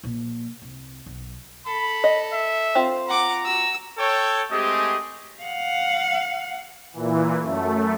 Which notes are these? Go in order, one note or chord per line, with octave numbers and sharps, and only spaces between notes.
A#1 A#2
C2
B1
A4 B5
D#5
E5
C4 F4 C5
F#5 A#5 D6
F#4 E6
A4 C#5 G5
G#3 A3 C4 G4 G#4 D#5
F5 F#5
A#2 E3
F#2 A3